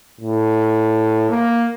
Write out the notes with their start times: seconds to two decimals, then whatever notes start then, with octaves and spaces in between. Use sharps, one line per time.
0.20 A2
1.29 A#3